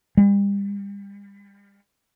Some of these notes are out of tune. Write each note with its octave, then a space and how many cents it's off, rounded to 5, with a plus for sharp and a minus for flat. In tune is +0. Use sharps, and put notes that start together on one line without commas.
G3 +35